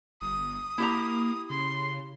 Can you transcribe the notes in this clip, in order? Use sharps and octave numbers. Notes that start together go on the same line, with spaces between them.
G1 D#6
A#3 E4 G4 A#5
C#3 C6